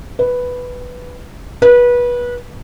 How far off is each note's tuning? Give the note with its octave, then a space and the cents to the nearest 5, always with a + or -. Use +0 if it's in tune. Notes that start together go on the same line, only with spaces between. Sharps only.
B4 +0
B4 -25